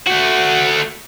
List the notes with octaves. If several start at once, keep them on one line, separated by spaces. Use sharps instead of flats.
A3 F#4